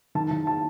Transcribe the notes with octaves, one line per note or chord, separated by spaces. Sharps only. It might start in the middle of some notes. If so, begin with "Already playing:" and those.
D#3 A5
D#3 A5
A5